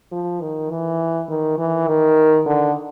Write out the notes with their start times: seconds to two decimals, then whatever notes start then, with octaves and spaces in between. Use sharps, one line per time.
0.11 F3
0.41 D#3
0.70 E3
1.29 D#3
1.58 E3
1.87 D#3
2.46 D3